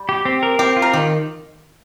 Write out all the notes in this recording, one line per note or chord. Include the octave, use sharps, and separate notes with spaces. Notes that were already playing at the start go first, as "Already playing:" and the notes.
Already playing: G3
G4
C4
A#4
C4 G4
F4
A#4
D#3 G4